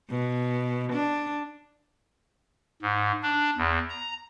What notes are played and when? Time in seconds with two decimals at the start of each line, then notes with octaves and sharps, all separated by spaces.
0.11 B2
0.92 D4
2.82 G#2
3.23 D4
3.57 E2
3.90 A#5